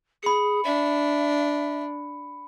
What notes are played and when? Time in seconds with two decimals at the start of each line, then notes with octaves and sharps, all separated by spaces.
0.23 G#4 B5 C#7
0.65 D4 E5